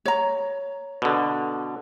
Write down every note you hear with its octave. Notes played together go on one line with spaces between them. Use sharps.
C#5 A#5
B2 D3